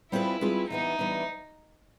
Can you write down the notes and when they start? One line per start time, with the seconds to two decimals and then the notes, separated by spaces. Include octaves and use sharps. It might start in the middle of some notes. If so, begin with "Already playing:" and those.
0.12 G3 C4 E4 F4 G#4 B4
0.41 G3 C4 F4 G#4 B4
0.70 E3 G3 B3 D4 D#4
0.99 E3 G3 B3 D4